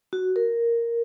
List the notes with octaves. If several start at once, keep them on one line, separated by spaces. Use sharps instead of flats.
F#4
A#4